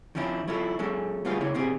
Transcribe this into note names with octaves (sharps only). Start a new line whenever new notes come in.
D#3 F3 C#4 D4 E4
F#3 E4 F4 A4
F#3 G#3 C#4 A4
A2 G3 B3 F4 G#4 F5
C#3 E4 C#5
B2 D#3 C4 G4 G#4